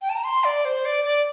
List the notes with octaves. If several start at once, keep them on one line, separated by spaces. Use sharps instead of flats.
G5
A5
A#5
C6
D5
C5
D5
D5